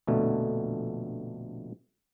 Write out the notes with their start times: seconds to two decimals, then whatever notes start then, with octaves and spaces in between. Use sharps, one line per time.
0.07 A#1 F2 B2 D3 A3